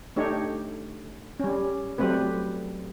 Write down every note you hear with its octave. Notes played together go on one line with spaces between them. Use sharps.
A3 D4 D#4 G4 C#5
G3 C#4
F#3 G3 A3 C4 B4